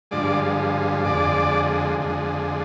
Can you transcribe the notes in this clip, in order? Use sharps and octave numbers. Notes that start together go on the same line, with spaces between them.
G2 D3 F3 G#3 D5
F2 D3 G#3 D5
F2 D3 G#3